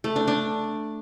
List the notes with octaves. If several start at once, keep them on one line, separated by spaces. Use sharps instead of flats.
A3
D4
D4